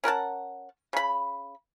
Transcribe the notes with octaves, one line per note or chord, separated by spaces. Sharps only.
C#4 A#4 F#5 A5
C#3 B5